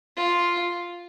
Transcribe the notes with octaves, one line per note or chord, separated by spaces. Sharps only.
F4